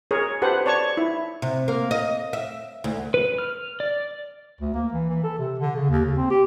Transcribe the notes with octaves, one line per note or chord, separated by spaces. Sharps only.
G#4 A#4 C#5
G4 A4 B4 C5 F#5
C#5 D5 A5 C#6
E4
C3
A#3
D#5
E5
D2
B4
F6
D5
D2
A#3
E3
E3
A4
C3
D3
C#3
D#2
C#3
C4
G4